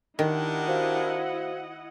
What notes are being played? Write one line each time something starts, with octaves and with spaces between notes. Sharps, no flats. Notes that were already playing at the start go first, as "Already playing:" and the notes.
D#3 D4 E4 G4 A#4 D#5 F#5
F#4 C5 F5